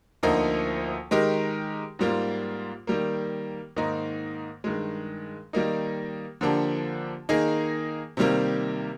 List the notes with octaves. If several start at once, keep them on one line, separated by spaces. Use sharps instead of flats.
D2 D3 F3 A#3 D#4
D#3 G#3 D#4 G4 A#4
G#2 G3 A#3 F4
D#3 G3 A#3
G#2 D#3 A#3 D#4
G2 D#3 G#3
D#3 G3 A#3 D#4
D3 F3 A#3 D4 G4
D#3 A#3 D#4 G#4
C3 D#3 G3 A#3